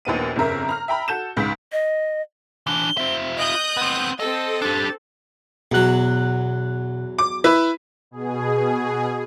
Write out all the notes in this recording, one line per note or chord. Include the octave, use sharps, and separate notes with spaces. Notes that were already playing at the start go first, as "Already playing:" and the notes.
A#1 D#2 B3 D#7
G1 F2 C#3 A#4 E5
A#5 F6
E5 G5 A#5 B5
F#4 A4 G6 E7
C#2 G#2 G6 B6
D#5
E3 D4 G7
C4 F4 E5
D#5 D#6 F#6 G6
B3 C4
C4 A4 D#5 E6
D4 G4 A6
E2 B2 F#3 F#6
D6
E4 B4
B2 G#4